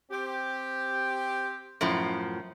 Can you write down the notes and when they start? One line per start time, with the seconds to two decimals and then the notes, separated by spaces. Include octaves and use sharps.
0.10 C4 G4
1.81 F#2 A2 F3